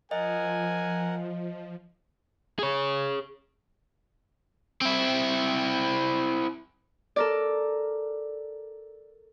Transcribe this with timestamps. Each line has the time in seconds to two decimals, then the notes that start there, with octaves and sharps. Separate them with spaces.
0.11 F3 A#4 D#5 F#5 G#5
2.59 G#4 C#5
4.81 C4 E4
7.16 A4 A#4 D5